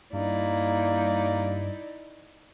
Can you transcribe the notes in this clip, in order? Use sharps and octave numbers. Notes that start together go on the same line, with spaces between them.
G2 A#3 D#4 E4 D5